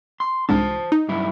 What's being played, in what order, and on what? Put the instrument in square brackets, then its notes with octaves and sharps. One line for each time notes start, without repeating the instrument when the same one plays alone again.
[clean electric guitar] C6
[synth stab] C2 G#2 D3 [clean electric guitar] C5 A5
[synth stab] D#4
[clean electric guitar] G2 F#3 E4